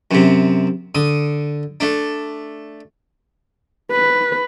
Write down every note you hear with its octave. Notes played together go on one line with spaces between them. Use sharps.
F#2 C3
D3 D#6
A3 D4
B4